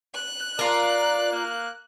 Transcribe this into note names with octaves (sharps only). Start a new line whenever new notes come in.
F#6
F4 A#4 D5
A#3